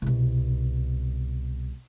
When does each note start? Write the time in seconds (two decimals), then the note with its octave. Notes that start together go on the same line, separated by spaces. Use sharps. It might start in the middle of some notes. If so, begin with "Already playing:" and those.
0.02 C2 B2